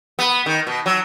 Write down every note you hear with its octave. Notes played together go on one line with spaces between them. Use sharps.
B3
D#3
B2
F#3